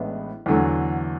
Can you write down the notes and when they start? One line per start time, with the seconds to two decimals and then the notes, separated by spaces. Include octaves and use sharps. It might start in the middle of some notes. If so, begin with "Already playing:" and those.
Already playing: A1 A2 G#3 B3 D4
0.46 E2 D3 F#3 A3